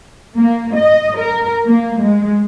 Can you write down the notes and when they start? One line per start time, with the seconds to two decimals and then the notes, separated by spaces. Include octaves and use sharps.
0.36 A#3
0.75 D#5
1.19 A#4
1.67 A#3
2.02 G#3